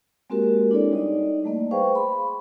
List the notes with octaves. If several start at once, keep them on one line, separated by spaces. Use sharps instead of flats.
G#3 A#3 C4 F#4 G4 A#4
D4 E4 A4 C#5 D5
G3 D#4 D5 D#5
G3 A3 A#3 D#5
G#4 B4 C5 F5 G5 C#6
B5 C6